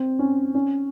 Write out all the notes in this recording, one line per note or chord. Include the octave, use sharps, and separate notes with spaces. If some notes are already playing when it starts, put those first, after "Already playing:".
Already playing: C4
C#4
C#4